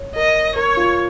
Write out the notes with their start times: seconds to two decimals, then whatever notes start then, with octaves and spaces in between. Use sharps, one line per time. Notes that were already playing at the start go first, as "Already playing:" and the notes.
Already playing: C#5
0.15 A#4 D#5
0.56 A#4 C#5
0.77 F4